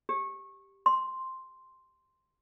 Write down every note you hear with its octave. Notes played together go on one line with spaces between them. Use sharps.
G4
C6